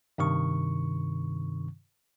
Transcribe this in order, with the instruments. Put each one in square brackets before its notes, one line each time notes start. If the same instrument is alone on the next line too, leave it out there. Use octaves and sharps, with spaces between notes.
[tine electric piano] G2 C3 D#3 C#6